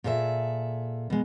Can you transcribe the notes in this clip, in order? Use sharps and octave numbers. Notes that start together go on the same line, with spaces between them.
A#2 G#4 A4 B4 E5
B2 G#3